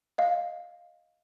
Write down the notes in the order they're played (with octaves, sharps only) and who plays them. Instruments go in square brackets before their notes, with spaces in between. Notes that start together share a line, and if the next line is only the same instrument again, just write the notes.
[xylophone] D#5 F5